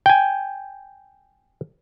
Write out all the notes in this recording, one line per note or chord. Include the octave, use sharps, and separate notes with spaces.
G5 G#5